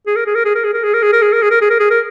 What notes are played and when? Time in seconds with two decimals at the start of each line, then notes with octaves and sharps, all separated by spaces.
0.07 G#4
0.16 A#4
0.26 G#4
0.35 A#4
0.45 G#4
0.55 A#4
0.64 G#4
0.73 A#4
0.84 G#4
0.94 A#4
1.03 G#4
1.13 A#4
1.22 G#4
1.32 A#4
1.42 G#4
1.51 A#4
1.61 G#4
1.70 A#4
1.80 G#4
1.90 A#4